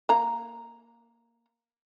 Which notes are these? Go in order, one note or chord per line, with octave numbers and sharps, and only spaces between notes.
A#3 A#5